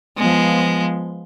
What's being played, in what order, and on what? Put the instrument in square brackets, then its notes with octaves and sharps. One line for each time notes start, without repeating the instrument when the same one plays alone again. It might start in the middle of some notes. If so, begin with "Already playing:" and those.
[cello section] F3 B3 [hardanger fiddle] G#3